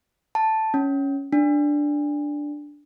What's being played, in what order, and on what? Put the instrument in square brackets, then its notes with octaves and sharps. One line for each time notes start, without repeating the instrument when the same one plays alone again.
[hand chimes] A5
C#4
D4